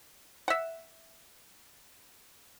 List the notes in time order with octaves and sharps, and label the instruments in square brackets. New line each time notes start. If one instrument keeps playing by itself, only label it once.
[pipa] E5 F#5